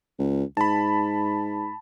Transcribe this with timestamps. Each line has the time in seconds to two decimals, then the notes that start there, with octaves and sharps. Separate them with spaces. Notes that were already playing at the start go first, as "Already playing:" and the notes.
0.19 C#2
0.57 G#2 A5 B5